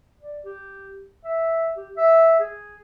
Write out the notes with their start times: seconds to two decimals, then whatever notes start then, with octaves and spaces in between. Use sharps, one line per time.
0.21 D5
0.45 G4
1.24 E5
1.77 G4
1.97 E5
2.40 G#4